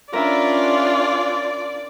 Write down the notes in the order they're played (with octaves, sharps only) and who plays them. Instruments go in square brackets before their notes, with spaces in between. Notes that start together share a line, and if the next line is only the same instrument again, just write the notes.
[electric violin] C#4 D4 [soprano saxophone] F4 [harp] A#4 E5 B5 [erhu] D5